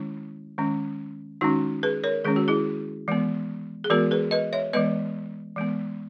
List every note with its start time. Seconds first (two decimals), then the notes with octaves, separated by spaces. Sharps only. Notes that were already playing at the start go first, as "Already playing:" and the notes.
Already playing: D#3 G#3 C#4 E4
0.58 D#3 G#3 C#4
1.41 D#3 G#3 C#4 D#4 F#4
1.83 G#4 B4
2.04 A#4 C#5
2.24 D#3 G#3 C#4 G#4
2.36 F#4
2.48 E4 G#4
3.08 E3 G#3 B3
3.84 G#4
3.90 E3 G#3 B3 F#4 A#4
4.11 G#4 B4
4.31 B4 D#5
4.53 C#5 E5
4.73 E3 G#3 B3 B4 D#5
5.56 E3 G#3 B3